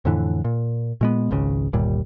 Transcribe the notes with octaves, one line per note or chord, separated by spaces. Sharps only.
F2 A2 D3 E3
A#2
A#2 G#3 B3
G#1 C#2 C#3
G1 D#2 A#2 G3